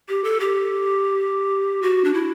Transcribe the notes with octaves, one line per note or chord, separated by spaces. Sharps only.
G4
A4
G4
F#4
D4
E4